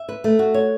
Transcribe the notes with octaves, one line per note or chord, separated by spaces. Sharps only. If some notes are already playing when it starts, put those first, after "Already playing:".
Already playing: E5
B4
A3
F#4
C#5